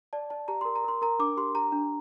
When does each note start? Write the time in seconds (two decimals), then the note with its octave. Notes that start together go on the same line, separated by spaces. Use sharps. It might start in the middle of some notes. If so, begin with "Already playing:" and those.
0.13 D5 A5
0.30 D5 A5
0.48 G4 A#5
0.61 A#4 C6
0.75 A#5
0.84 A#4 C6
1.02 A#4 A#5
1.19 D4 D6
1.37 G4 C6
1.55 G4 A#5
1.72 D4